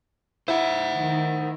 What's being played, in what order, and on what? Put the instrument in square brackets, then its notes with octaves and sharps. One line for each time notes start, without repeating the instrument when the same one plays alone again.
[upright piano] E4 [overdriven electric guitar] C5 F#5
[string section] D#3